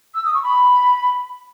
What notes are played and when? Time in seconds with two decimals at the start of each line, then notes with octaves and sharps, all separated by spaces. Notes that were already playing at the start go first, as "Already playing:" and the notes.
0.14 E6
0.25 D#6
0.34 C#6
0.43 B5